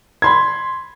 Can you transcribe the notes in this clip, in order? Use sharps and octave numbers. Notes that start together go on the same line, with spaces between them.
B5 C6 G#6